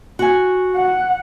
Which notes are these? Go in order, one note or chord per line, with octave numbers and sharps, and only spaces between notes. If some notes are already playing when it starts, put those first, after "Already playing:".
F#4 G#5
F#5